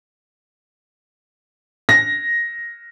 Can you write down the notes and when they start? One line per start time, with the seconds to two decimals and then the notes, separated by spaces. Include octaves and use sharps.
1.89 A#6